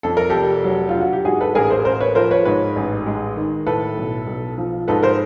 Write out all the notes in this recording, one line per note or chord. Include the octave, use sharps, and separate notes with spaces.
F2 A4
A#4
F1 G4 A4
F#3
F4
D3
F#4
G4
G#2 F#4 G#4
A4 B4
A1 G#4 A#4
A#4 C5
A1 A#4 C5
B4 C#5
F3 A#4 C5
B4 C#5
G#2 B4 C#5
A1
G#3
D#3
A2 A4 B4
B1
B1
F3
G#2 A4 B4
A#4 C5